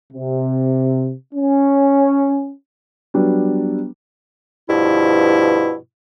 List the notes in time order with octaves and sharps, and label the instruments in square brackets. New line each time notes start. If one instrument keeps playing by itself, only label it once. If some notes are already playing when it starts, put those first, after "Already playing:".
[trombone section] C3
C#4
[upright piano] F#3 G3 B3 D4
[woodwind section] G2 B2 F3 E4